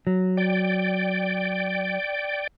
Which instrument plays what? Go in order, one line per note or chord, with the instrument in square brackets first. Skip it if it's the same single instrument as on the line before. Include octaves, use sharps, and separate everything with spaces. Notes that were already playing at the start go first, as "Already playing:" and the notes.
[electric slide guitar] F#3
[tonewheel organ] D5 G5